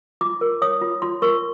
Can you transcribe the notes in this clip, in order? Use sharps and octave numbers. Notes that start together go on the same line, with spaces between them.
F4 D6
A#4
C#5 D#6
F4
F4 C6
A#4 C#6